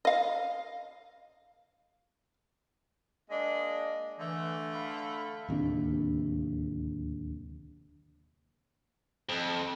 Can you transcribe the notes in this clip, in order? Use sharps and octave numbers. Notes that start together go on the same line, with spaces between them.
D#5 F5
G#3 A#3 D4 D#5
D3 E3 A3
F5 B5
D1 D#2 C3 D4
F2